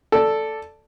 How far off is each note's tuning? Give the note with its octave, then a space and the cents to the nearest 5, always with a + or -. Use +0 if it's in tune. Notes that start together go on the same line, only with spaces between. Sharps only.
A4 +0 D5 +0